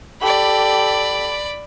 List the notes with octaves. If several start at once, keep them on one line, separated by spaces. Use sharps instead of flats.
G4 A4 D5 B5